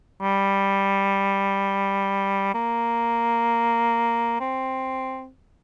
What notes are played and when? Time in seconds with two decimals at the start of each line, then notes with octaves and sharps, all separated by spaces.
0.21 G3
2.54 A#3
4.40 C4